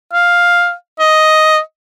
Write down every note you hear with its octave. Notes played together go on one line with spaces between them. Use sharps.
F5
D#5